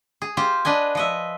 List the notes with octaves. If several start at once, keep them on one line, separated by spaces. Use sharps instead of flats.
G#4
F4 G4 C5
D4 B4 D#5 G#5
F3 D#5 E5